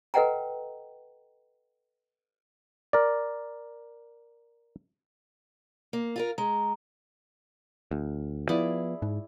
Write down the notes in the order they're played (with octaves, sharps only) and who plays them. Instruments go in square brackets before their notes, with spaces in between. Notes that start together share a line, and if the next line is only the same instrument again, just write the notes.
[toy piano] A4 B4 D#5 F#5 G5 A#5
[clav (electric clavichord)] A#4 D5
[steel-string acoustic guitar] A#3
F4 G#4 A#4
[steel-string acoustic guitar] G#3 [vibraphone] A#5
[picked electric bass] D2
[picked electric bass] F3 B3 [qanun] E4 G#4 D5
[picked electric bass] G#2